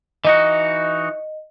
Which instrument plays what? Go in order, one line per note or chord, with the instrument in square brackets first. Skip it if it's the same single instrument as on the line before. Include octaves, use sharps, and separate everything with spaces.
[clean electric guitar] E3 D#4 F#4 [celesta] D#5